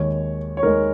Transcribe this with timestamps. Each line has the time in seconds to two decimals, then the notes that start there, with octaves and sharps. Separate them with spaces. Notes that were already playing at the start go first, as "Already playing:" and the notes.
Already playing: D#2 D#3 G#3 C#5
0.57 C#5
0.63 D#2 D#3 G#3 A#4